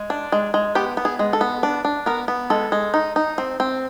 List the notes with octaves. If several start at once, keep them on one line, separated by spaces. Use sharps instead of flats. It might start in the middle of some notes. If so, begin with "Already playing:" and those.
Already playing: G#3
D4
G#3
G#3
B3 G4
B3
G#4
G#3
A4
B3
D4
D4
B3 A#4
B3
G#3 A4
G#3
D#4
D#4
C4
C4